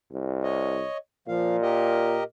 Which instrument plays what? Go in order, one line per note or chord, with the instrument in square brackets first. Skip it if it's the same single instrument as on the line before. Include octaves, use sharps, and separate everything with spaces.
[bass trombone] C2
[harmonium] C#5 D#5
[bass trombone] A#2 [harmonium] F3 F5
[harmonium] G4 A#4 D#5